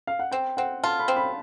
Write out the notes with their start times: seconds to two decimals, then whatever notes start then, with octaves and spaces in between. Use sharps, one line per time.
0.07 F5
0.19 F#5
0.31 C4 G5
0.57 C4 F#5
0.84 F4 A5
0.99 B5
1.08 C4
1.17 B5